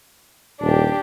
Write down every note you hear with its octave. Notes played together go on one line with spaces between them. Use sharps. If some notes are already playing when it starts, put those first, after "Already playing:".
D#1 D4 G4